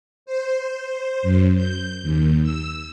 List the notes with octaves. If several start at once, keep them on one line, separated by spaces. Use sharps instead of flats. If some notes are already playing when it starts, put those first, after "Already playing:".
C5
C5
F#2
G6
D#2
E6